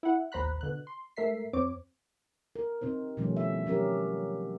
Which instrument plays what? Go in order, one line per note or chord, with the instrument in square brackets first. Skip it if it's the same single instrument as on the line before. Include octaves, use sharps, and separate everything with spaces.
[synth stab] E4 F#5
A1 D#2 C5 A#5 B5 F#6
B2 D3 F#6
C6
G#2 A3 A#4 E5 B6 C7
F2 C4 C#5 D6
[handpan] A#4
C3 C4 D#4 C5
B2 D#3 F3 G3 A3 C#4
E5
F#3 C#4 G4 A#4